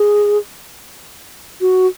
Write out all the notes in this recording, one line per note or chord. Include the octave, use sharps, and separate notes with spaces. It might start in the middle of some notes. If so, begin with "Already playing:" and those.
Already playing: G#4
F#4